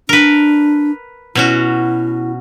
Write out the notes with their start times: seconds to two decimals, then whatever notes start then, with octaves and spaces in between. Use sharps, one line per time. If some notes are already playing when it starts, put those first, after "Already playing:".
0.09 D4 A#4 B4
1.35 B2 C#4 E4 F#4